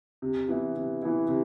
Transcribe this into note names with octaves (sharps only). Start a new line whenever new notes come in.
C3
E3 B3 E4
C3
E3 B3 E4
C3